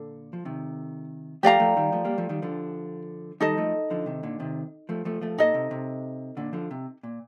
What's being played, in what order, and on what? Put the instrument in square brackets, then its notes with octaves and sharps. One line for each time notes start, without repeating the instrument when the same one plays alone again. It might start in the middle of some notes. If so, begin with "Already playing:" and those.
Already playing: [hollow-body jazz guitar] A#2 D3 [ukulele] A4
[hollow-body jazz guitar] F3
C3 D#3
[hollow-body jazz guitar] F3 A3 [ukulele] G4 D5 F5 A#5
[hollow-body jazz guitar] F3 A3
D#3 G3
F3 A3
G3 A#3
F3 A3
D#3 G3
D3 F3
[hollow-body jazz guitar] D#3 G3 [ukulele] D#4 A4 D#5
[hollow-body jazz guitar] F3 A3
D3 F3
C3 D#3
A#2 D3
C3 D#3
F3 A3
F3 A3
F3 A3
[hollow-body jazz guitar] A#2 [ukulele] D#4 A4 D#5
[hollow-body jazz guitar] C3
C3
A#2 D3
D3 F3
C3
A#2